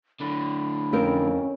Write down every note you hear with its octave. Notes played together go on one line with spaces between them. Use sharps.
A2 D3 B5
F2 C4 C#4 A#4